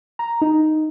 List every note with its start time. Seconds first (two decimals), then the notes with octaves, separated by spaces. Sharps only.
0.19 A#5
0.41 D#4